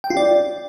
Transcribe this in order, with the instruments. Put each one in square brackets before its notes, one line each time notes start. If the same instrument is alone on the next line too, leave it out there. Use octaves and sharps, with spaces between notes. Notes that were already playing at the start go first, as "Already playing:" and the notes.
[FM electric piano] G5
F4
D5